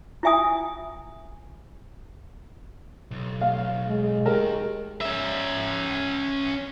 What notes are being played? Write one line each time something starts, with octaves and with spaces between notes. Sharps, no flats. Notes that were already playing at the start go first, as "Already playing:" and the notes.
E4 F4 E5 G#5 D#6
B1
F5
G#3
D#3 G4 A#4
C#4 E5